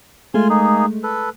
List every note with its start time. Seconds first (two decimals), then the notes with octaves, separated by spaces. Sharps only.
0.34 G#3 A3 F4 G#5 C6
0.50 A#3 D#4 G#4
1.03 A4 B4